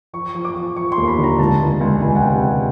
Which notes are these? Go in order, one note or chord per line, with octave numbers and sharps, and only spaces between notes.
F3 C#6
F3
D6
F3
F3 C#6
C6
D#2
B5
D3
A#5
C#2 A5
C#2
C#2
C#2 G#5
F#5
C3 G5